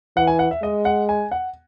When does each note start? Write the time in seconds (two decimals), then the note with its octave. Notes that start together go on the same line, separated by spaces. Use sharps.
0.16 E3 F#5
0.27 G#5
0.39 F#5
0.51 E5
0.62 G#3 D#5
0.85 F#5
1.09 G#5
1.32 F#5